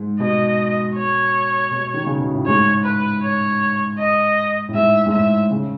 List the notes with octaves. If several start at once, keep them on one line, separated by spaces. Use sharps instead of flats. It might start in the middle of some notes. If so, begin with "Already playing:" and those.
Already playing: G#2
B2 D#5
C#5
B2
D#3
C#3
B2
A2
G#2 C#5
B4
C#5
D#5
A2
G#2 E5
G#2
A2 E5
C#3